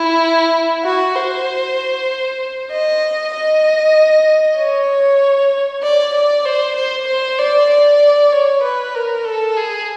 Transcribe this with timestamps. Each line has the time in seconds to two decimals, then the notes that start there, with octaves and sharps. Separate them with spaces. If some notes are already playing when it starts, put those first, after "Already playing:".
Already playing: E4
0.84 F#4
1.16 C5
2.71 D#5
3.34 D#5
4.58 C#5
5.83 D5
6.14 D5
6.45 C5
6.76 C5
7.07 C5
7.38 D5
7.70 D5
8.32 C#5
8.63 B4
8.94 A#4
9.25 A4
9.57 G#4